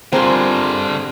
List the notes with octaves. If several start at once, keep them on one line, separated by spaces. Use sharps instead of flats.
D3 G3 C4 F4 G#4 A#4